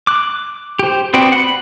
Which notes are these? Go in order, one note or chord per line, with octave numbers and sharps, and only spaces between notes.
D6 F#6
G4 C5
B3 C4 F#4 D5 G5
F#5 B5